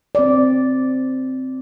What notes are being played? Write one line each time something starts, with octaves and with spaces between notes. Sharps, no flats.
C4 D5